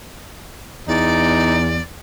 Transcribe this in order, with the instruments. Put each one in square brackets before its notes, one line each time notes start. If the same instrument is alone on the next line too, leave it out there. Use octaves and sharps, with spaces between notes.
[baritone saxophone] E2 [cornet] D#4 [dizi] D5